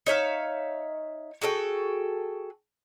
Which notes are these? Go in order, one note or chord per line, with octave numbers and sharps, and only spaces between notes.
D#4 C#5 E5 F5
F#4 G#4 A4 G5